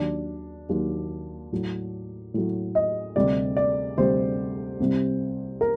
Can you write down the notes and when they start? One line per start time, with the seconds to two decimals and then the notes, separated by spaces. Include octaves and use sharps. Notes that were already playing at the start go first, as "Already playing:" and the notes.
Already playing: D#2 D#3 F#3 D4
0.69 D#2 D#3 F#3
1.52 A2 F#3
2.34 A2 F#3
2.75 D#5
3.16 D2 C3 G3 D5
3.57 D5
3.97 D2 C3 G3 C5
4.80 C2 C3 G3
5.61 A#4